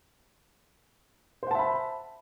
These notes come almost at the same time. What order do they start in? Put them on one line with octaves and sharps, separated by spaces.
C5 F#5 A5 E5 B5